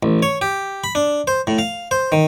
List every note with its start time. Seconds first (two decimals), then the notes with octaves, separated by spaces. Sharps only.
0.03 A1
0.23 C#5
0.41 G4
0.84 B5
0.95 D4
1.27 C5
1.47 A2
1.59 F5
1.91 C5
2.12 D#3